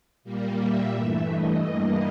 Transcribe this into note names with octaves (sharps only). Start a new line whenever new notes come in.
A#2 G3 A#3
E5
G2 E3 A3
D#5
G2 E3 G3 A#3